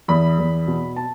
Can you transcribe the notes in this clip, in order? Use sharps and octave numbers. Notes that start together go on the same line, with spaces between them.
E2 B5
E2
B2
A5